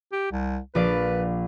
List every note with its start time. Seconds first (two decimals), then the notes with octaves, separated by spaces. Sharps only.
0.12 G4
0.32 C2
0.75 A#1 B4 D5 F5